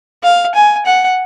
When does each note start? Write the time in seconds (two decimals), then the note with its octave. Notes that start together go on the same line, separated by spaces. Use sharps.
0.24 F5
0.55 G#5
0.86 F#5